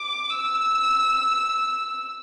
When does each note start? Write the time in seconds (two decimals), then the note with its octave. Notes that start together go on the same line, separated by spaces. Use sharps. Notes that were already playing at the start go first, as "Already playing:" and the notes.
Already playing: D6
0.31 E6